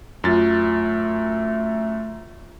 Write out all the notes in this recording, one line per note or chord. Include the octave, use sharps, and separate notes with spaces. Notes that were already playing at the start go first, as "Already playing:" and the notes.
F#2 A3 F4 A6